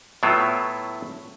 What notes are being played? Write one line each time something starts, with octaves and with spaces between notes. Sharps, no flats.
A2 F#3 A3 B3 E4 F4